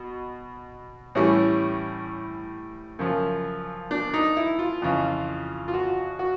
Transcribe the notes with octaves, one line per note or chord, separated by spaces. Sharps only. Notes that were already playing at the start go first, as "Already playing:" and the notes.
Already playing: B2
A2 E3 G3 C#4
F#2 C#3 F3
D4
D#4
E4
F4
F2 C#3 E3
F4
F#4
F#4